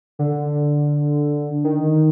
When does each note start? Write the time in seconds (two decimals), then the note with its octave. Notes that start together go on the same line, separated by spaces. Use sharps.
0.19 D3
1.64 D#3